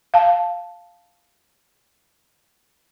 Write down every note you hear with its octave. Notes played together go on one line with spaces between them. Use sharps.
F5 A5